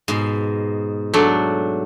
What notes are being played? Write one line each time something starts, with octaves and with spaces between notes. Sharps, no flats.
G#2 B2
F#3 A3 D4